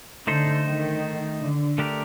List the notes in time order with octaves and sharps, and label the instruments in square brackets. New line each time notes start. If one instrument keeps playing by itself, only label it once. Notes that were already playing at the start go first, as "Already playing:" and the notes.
[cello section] D3 [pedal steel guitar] A3 D#4 A4 C5
[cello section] D#3
D3
[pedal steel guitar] D3 A3 D4 G4 A#4